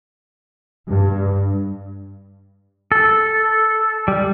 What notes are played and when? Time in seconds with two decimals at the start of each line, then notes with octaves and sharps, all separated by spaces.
0.88 G2
2.92 A4
4.08 G3